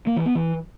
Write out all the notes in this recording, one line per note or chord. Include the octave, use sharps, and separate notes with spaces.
A#3
E3
B3
E3